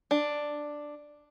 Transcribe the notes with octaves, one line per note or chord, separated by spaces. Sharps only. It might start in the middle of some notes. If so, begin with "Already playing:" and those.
D4